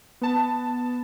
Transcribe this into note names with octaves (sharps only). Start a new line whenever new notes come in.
B3 A5